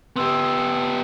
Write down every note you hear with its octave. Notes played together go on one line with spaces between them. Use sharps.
B3 G4 C6 D#6 E6